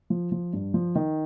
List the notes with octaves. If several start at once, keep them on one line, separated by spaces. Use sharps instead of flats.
F3
F3
G2
F3
D#3